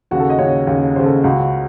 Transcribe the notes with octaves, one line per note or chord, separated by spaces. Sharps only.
D#2 C#3 F#4
A4
D#5
D#2 C#3 C#5
D#2 C#3
D#2 C#3 C5
A4
C#2 C#3 F#4